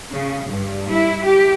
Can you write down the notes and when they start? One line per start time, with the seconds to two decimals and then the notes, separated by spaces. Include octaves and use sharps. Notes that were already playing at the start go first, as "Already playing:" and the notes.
0.12 C#3
0.50 G2
0.90 E4
1.24 G4